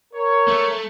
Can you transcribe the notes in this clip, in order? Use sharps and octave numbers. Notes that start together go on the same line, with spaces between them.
A#4 C#5
A3